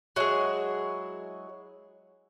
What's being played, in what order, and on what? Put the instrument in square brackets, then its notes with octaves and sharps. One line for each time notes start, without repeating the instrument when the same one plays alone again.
[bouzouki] F#3 G#3 E4 [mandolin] F#4 G#4